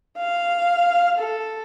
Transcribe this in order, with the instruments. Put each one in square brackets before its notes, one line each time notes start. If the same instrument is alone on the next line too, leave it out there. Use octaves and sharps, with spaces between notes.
[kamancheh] F5
A4